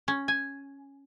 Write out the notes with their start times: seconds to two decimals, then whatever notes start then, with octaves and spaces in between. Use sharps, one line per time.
0.08 C#4
0.28 G#5